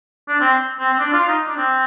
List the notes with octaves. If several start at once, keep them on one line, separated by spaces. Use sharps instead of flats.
D4
C4
C4
C4
D4
F4
D#4
D4
C4